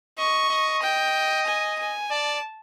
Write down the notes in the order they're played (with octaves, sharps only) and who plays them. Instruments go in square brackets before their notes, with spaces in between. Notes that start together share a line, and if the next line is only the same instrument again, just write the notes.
[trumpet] D#5 [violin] C#6
[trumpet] D#5
[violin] G5
G#5
G#5
[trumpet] D5 [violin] A5